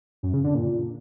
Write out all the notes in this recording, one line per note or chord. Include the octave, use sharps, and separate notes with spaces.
F#2
C#3
D3
A#2